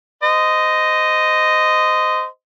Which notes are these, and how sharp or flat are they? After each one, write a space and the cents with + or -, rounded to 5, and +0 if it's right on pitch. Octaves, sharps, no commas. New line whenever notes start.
C5 -25 D#5 +0